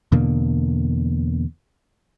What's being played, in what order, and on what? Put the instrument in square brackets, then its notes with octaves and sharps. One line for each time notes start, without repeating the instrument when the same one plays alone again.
[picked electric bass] E2 B2 D3 A#3